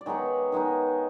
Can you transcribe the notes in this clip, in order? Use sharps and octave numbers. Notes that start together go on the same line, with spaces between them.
D5
D#3 G#3 B3 D#4 C#5
D#3 G#3 B3 D#4